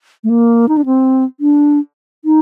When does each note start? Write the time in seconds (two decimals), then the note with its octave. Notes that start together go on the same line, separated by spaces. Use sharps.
0.24 A3
0.30 A#3
0.69 D#4
0.77 D4
0.86 C4
1.40 D4
2.25 D#4